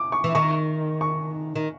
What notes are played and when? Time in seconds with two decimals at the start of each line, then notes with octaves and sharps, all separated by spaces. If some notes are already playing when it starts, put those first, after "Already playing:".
Already playing: D6
0.12 C#6
0.24 E3
0.35 D#3 C#6
1.01 C#6
1.56 D#3